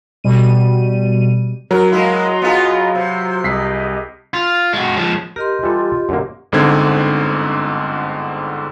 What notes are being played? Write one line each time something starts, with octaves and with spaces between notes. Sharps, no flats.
B2 G3 D#7
F#3 A#4
G#3 A#3 E4 D#5 A#5 C6
B3 F4 G#4
C3 C5
C2 G4 G#4 D#5 B6 C7
F4
G#3 F#4
F3 G#3
G4 A#4 D#5 C6
E3 G3 F4 A4
F#2 D3 A#3
G1 G#2 D3 C4 G#6